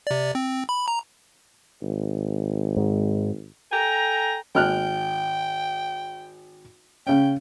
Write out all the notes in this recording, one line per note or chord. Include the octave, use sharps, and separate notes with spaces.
C3 D5
C4
B5
A#5
G#1
G#2
A4 G5 G#5 A#5
G#1 G5 F6 F#6
C#3 C#4 G5